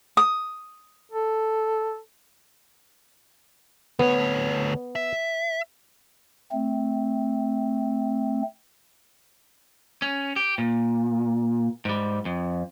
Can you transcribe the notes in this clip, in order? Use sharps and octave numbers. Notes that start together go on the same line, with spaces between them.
D#6
A4
D2 B3 C#5
E5
A3 C4
C#4
G4
A#2
G#2 G3
F2